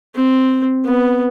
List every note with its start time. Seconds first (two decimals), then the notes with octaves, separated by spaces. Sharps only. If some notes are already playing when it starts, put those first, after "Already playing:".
0.15 C4
0.85 B3